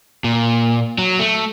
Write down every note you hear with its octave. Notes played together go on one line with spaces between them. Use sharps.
A#2
F#3
A3